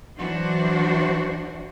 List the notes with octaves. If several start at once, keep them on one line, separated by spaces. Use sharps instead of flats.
E3 F#3 D4 F#4 C5